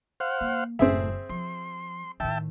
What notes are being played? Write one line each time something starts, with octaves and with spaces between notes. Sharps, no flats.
C5 F5 F#5
A#3
F#1 A2 C4 G#4 E5
F3 C6
A2 D#3 E5 G5 A5